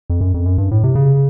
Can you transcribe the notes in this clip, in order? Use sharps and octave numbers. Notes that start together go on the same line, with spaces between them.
F2
F#2
F2
F#2
G2
A2
C3
C#3